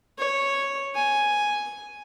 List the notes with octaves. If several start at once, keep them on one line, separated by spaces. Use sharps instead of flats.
C#5
G#5